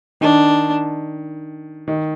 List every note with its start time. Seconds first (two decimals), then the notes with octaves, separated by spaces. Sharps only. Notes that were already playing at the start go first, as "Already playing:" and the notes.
0.21 D#3 D4
1.88 D#3